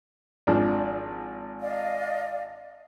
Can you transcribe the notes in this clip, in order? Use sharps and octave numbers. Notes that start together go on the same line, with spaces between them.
G#1 F3 D4
D5 D#5 F5